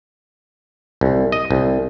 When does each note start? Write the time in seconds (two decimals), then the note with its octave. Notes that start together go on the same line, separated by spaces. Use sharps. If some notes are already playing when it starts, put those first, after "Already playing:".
1.01 C2
1.32 D#5
1.51 C2